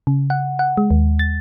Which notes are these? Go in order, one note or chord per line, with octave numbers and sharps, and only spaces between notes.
C#3
F#5
F#5
G#3
D#2
A6